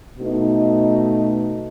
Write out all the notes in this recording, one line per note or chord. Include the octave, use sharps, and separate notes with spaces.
B2 A3 D#4